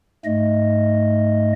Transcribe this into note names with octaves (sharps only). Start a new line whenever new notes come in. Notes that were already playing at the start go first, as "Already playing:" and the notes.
G#2 A3 D#5